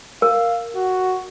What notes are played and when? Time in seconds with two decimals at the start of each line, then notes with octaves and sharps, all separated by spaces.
0.22 A#4 F5
0.76 F#4